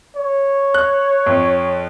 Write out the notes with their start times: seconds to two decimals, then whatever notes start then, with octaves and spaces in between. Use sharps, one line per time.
0.16 C#5
0.74 F#6
1.26 F2